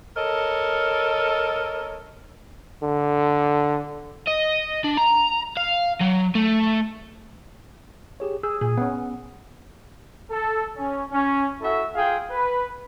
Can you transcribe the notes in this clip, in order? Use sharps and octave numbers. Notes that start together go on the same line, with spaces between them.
A4 A#4 C#5 D#5
D3
D#5
D4
A#5
F5
F#3
A3
G4 G#4 C#5
G#4 E6
A#2 G#4
B3 C#4 F#5
A4
C#4
C#4
E4 F#4 A4 E5
F4 G#4 F5 G5
B4